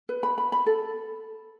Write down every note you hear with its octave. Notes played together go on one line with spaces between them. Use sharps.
B4
B5
B5
B5
A4